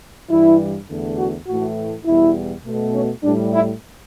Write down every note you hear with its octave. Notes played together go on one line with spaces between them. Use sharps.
G2 E3 G3 E4
E2 D3 A3
F#4
A2 E3 A3 F#4
E2 B2 G3 E4
B2 A3
C#4
A2 G3 D4
E4